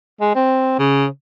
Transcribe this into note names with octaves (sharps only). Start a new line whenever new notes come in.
G#3
C4
C#3